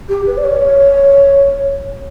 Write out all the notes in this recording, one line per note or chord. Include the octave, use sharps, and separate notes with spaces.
G4
B4
D5
C#5